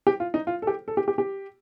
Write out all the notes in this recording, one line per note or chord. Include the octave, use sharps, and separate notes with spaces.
G4
F4
D#4
F4
A4
G4
A4
G4
G4
G4